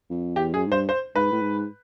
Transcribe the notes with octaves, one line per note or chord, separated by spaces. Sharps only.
F2
E2 G4
F#2 G#4
G#2
G2 C5
C5
G#2 B4
A2
G#2